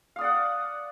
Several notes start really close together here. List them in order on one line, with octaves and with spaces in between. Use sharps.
F5 D#6 D5 F#5